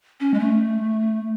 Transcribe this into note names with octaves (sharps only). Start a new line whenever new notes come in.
C#4
G#3
A3